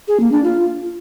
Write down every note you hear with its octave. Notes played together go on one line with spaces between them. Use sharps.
G#4
A#3
D4
F4